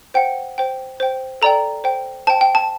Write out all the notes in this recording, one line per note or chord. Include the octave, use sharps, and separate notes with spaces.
C5 F#5 G5
C5 G5
C5 G5
A4 D5 G5 A#5
C5 G5
C5 G5 A5
G5
A5